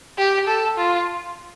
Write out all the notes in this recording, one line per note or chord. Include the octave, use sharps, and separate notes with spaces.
G4
A4
F4